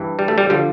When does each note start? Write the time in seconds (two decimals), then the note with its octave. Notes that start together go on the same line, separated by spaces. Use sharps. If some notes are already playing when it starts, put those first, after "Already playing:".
Already playing: G2 E3
0.19 G3
0.28 A3
0.38 G3
0.50 D3 F3 G3